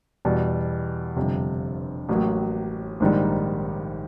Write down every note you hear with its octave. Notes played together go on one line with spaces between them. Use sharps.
E2 B2 G3
G1 F2 C3
A1 A2 F#3 A#3
A#1 G#2 D#3 G3